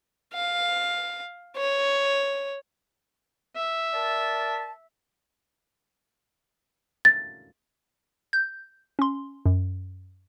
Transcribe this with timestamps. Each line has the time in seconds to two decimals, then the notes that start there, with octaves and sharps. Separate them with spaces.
0.34 F5
1.57 C#5
3.56 E5
3.93 A#4 D5 A5
7.05 A6
8.33 G6
8.99 C#4 C6
9.45 F#2